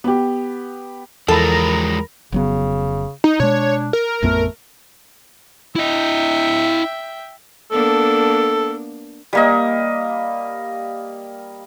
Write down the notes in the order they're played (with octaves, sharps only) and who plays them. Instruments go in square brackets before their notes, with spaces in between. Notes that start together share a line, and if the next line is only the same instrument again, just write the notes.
[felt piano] B3 G4
[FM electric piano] E2 E3 B5 [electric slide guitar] F3 G#3 [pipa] A4 [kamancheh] A#4 A#5
[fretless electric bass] F1 F#3 B3 [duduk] C#3
[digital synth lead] D#4
[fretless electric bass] B2 G#3 [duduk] D4 [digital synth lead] C#5
[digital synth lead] A#4
[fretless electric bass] A1 F2 B3 [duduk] A3
[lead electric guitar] E4 D#5 [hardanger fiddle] E5 G5
[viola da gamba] A#3 B3 D4 [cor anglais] A4
[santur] G3 A#3 D#5